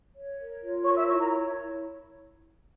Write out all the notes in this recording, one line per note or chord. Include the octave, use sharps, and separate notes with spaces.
C#5
A#4
F4
A#4 C#5 C#6
E5 E6
E4 C#5 C#6
A#4 A#5
C#5
E4